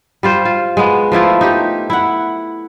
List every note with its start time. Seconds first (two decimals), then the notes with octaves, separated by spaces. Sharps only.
0.23 G3 F4 C5
0.45 F4
0.77 G#3 B3
1.12 F3 A3 E4 F4
1.41 D#4 G4
1.90 E4 F#5